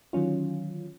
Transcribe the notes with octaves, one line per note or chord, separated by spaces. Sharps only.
D3 D#3 F#3 C#4 F4